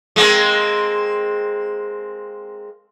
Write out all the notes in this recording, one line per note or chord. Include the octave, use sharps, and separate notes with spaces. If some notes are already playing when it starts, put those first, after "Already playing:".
G#3 A#3 C4